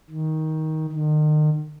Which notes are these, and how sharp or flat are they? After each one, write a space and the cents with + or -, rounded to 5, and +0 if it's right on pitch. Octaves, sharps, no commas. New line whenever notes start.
D#3 +15
D#3 -35